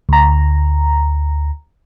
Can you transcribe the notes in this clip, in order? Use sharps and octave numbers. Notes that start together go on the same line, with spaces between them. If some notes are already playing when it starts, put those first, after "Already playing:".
D2 A#5